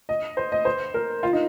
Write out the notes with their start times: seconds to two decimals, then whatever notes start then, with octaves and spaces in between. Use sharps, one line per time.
0.09 D#5
0.37 C5
0.52 D#5
0.65 C5
0.94 A#4
1.23 F4
1.33 D#4